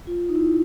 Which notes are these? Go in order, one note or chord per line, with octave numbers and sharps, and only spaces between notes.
F4
D#4
E4